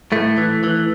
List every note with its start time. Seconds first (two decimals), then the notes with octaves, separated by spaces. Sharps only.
0.12 A2 A3
0.38 E3
0.64 E3